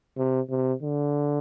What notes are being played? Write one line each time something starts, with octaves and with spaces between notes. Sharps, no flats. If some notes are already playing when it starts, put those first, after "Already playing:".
C3
C3
D3